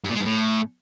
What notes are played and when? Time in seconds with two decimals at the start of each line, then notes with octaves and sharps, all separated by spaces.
0.04 G2
0.10 A#2
0.15 G#3
0.20 G2
0.25 A2